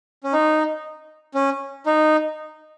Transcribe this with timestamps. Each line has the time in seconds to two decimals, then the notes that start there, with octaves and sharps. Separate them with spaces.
0.24 C#4
0.33 D#4
1.34 C#4
1.86 D#4